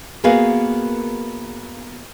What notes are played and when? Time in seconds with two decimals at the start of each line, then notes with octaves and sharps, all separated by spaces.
0.24 A#3 B3 F#4 G#4 A#4 F5